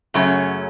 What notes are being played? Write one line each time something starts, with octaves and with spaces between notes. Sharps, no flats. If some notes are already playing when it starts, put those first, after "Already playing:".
F#2 C#3 F#3 A3 C#4